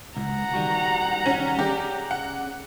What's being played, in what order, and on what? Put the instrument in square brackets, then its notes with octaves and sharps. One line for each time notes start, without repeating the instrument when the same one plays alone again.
[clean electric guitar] C#2 [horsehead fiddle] F#5 A#5
[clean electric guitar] D#3 G3 F#4
[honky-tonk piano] C#4
[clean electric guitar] C#4 G#4 D5 [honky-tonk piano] G4
[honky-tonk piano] F#5